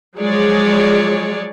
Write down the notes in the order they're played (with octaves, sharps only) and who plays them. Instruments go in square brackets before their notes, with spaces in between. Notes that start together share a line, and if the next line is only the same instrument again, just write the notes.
[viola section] F3 F#3 G#3 G#4 C#5 D5